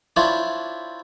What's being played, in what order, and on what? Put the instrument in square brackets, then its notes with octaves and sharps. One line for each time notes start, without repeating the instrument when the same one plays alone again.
[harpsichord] D4 E4 F4 C5 C#5